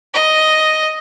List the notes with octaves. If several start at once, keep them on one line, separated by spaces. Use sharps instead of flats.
D#5